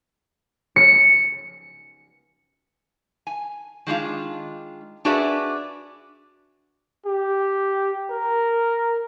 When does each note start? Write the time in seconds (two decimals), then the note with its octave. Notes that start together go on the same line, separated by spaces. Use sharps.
0.76 C#7
3.27 G#5
3.87 D#3 G#3 D4 F4
5.05 D4 F#4 G#4 B4 D5 E5
7.06 G4
8.10 A#4